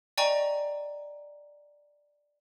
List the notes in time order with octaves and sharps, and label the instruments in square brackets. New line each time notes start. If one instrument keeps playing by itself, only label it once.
[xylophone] D5 D#5 G5 G#5 A#5 C#6